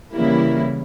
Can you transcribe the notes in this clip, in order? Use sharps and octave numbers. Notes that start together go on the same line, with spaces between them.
C#3 E3 G3 A#3 E4